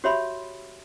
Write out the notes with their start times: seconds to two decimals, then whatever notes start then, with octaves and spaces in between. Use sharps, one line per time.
0.04 F#4 G4 C#5 E5 B5 C6